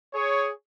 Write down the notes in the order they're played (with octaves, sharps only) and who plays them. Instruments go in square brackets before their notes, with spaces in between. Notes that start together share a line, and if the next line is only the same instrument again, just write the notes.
[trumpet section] G#4 C#5